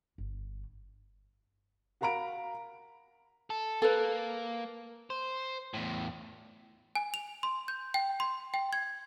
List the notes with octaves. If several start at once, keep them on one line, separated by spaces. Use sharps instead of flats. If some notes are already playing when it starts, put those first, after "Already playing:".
G1
F#4 A#4 F5 A#5 B5 D7
A4
A#3 A4 B4
C5
E2 A2
G#5
F7
C6
G6
G5
C6
G5
G#6